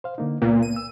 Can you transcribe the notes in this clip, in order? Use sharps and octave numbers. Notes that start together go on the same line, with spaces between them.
C5 F5
D3 A#3 D#4
C#2 A#2 A#3 B3
D#7
E6